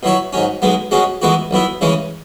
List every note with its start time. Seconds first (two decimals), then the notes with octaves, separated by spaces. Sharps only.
0.03 B2 F#3 E4 C#5
0.33 G#2 F#3 C#4
0.62 B1 B2 G#3 B3
0.91 B2 G#3 C#4 F#4
1.22 E3 G#3 B3 F#4
1.51 B1 B2 B3 E4
1.81 C#3 E3 G#3 C#4